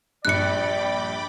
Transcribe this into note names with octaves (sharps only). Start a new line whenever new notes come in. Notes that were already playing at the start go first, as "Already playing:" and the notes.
A#1 G2 D5 G5 B5 D6 F#6 C#7